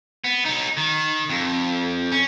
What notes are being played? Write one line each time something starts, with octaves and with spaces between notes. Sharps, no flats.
B3
F#3 D#4
D#3
F2
C#4